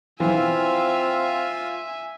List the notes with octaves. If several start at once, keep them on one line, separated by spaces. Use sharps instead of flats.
E3 C4 F4 E5 F5 G#5